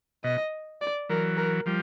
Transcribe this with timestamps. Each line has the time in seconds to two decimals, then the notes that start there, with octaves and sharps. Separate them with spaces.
0.24 B2 D#5
0.81 D5
1.09 E3 F#3 A#4
1.37 A#4
1.66 F3 G3